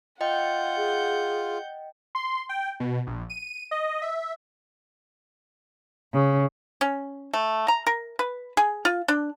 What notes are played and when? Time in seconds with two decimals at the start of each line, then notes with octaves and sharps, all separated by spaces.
0.21 F4 D#5 F#5 G5 G6
0.77 G#4
2.15 C6
2.49 G5
2.80 B2
3.07 A#1
3.30 D#7
3.71 D#5
4.02 E5
6.14 C#3
6.81 C#4
7.33 A3
7.68 A#5
7.87 A#4
8.19 B4
8.57 G#4
8.85 F4
9.08 D4